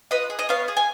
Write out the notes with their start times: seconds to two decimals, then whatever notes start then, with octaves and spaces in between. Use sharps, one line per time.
0.11 F4 B4 D#5
0.30 G#4
0.39 D#5
0.49 B3 C#5 F5
0.68 G#4
0.77 G#5